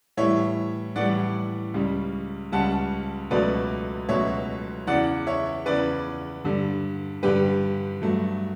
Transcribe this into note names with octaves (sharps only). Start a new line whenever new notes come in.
A2 E3 G3 C#5 E5
A2 E3 G3 D5 F#5
C#2 C#3 G3
C#2 C#3 G3 F#5 A5
C#2 B2 F#3 A3 B4 D5
C#2 B2 F#3 A3 C#5 E5
E2 C#3 E3 D5 F#5
C#5 E5
E2 C#3 E3 B4 D5
G2 D3 G3
G2 D3 G3 G4 B4
G2 F#3 A3